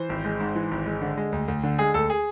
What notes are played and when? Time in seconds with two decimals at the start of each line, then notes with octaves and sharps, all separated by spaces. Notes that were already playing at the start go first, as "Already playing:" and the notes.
Already playing: E3 C5
0.09 G#1
0.25 G#3
0.40 G#2
0.55 E3
0.71 G#1
0.86 G#3
1.02 D3
1.17 G#3
1.32 D2
1.48 D2
1.63 D3
1.79 G#3 G#4
1.94 D2 A4
2.10 G#4